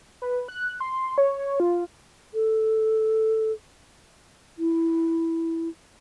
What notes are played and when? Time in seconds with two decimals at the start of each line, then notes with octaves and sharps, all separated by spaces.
0.22 B4
0.48 F#6
0.80 C6
1.18 C#5
1.60 F4
2.34 A4
4.59 E4